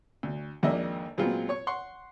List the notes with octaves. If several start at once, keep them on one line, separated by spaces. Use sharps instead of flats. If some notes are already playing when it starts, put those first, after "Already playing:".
D2
G#1 F2 A#3 D4 D#5 E5
A#2 F#3 G#3 B3 C4 F4
C#5 C#6
F#5 C6 C#6